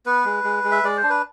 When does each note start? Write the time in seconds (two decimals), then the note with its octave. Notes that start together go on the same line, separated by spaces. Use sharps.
0.06 B3 B4
0.25 G#3
0.44 G#3
0.64 G#3
0.71 E5
0.83 G#3 D5
0.97 C5
1.03 D4
1.10 B4